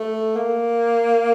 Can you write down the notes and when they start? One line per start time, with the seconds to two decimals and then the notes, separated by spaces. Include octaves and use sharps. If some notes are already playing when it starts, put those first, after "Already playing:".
Already playing: A3
0.36 A#3